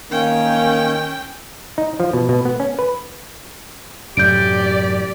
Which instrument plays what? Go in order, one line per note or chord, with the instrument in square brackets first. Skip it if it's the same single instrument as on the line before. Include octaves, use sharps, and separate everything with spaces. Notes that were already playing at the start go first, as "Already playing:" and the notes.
[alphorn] D#3 [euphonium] A#3 [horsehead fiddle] C#4 [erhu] G5
[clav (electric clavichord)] D#4
F3
B2
B2
B3
C#4
B4
[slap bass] F#2 A2 C3 [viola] G4 D5 [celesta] G6 D7